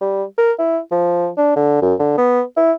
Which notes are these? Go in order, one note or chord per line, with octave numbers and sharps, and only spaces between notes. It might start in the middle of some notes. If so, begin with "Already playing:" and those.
G3
A#4
E4
F3
D4
D3
F#2
D3
B3
E4